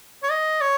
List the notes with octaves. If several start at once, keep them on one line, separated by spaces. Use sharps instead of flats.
C#5
D#5
C#5